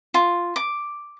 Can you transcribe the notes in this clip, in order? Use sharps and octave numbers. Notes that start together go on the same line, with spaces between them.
F4
D6